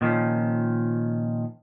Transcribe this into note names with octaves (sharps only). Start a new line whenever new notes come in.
A#2 D#3 F3 C#4